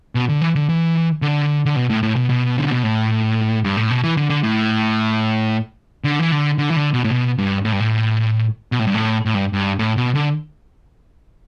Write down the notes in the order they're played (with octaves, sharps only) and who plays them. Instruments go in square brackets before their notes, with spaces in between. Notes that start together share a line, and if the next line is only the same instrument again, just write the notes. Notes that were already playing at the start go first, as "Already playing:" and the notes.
[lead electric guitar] B2
D3
E3
D3
E3
D3
D3
B2
A2
A2
B2
B2
D3
B2
A2
G2
A2
B2
E3
D3
D3
A2
D3
E3
D3
D3
E3
D3
B2
A2
B2
G2
A2
G2
A2
B2
A2
G2
A2
A2
G2
G2
A2
B2
D3